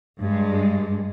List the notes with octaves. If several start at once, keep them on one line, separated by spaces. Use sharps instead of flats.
G2 G#3